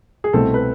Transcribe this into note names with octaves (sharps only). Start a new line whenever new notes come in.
G#4
C2 B2 A3 C4 A4
B4